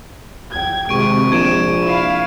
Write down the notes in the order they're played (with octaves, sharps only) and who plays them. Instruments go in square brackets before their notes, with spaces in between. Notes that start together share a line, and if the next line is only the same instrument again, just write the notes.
[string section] G5 G#6
[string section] G#1 C3 [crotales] C#6 D7
[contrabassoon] A#1 [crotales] G#6 D7 E7
[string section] E4 F5